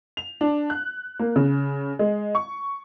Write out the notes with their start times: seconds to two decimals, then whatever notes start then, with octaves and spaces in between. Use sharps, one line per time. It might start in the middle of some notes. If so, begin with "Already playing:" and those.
0.17 F7
0.41 D4
0.70 F#6
1.19 A#3
1.36 C#3
1.99 G#3
2.35 C#6